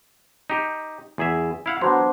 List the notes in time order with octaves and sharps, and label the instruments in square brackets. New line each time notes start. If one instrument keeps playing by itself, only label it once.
[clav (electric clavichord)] D#4 G4
E2 G#4 E5
E4 F5 F#5
[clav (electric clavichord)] F#3 [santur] B3 D4 C5